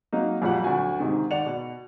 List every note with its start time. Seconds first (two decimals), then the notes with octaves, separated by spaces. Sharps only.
0.13 F#3 A#3 D#4
0.42 F2 A#2 F#3 G3 F#5
0.64 D2 F#3 F#4 G#5
1.00 G#2 C3 D#3
1.31 D#2 D5 F#5 C#7 F7
1.46 B2